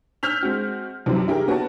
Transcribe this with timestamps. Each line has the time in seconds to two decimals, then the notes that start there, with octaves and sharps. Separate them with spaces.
0.23 E6 F6 G6 B6 F7
0.43 G#3 C4 F#4
1.06 F#2 C3 E3 F3 G3
1.28 E4 G4 G#4 A#4
1.48 B3 F#4 B4 C#5 A5